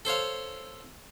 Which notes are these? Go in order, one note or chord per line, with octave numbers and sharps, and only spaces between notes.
A4 C5 C#5 F5